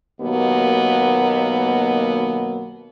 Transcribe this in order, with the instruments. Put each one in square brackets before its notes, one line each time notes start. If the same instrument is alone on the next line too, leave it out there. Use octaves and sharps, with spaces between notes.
[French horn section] D#2 B2 F#3 A#3 B3